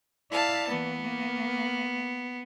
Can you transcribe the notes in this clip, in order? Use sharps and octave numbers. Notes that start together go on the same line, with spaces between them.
E4 D5 F5 A5
E3 A#3 B3
A#3